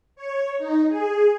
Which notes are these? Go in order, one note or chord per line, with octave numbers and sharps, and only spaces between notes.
C#5
D#4
G#4